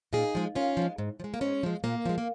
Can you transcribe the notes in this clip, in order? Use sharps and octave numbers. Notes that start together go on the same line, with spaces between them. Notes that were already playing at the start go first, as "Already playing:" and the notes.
A#2 D#4 G#4
F3 G#3
A#2 C#4 F4
F3 G#3
G#2
F3
G#3
A#3
G#2 G#3 C#4
F3 G#3
A#2 A#3
F3 G#3
A#3